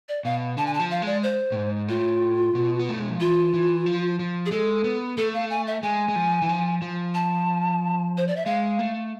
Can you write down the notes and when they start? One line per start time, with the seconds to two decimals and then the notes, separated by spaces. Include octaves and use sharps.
0.09 D5
0.25 B2 F5
0.57 D3 A5
0.66 G#5
0.74 A5
0.80 F3
0.91 F5
1.02 G#3 D5
1.23 C5
1.52 A2
1.56 G#2
1.88 A2 F4
2.55 B2
2.79 B3
2.89 A3
2.99 G#3
3.09 F3
3.20 E3 F4
3.54 E3
3.86 F3
4.19 F3
4.46 G#4
4.51 G#3 A4
4.84 B3
5.17 A3 A4
5.34 F5
5.50 G#5
5.67 E5
5.83 G#3 G#5
6.08 G#3
6.16 F3
6.42 E3
6.49 F3
6.82 F3
7.14 A5
8.17 C5
8.28 D5
8.36 E5
8.46 G#3 F5
8.79 A3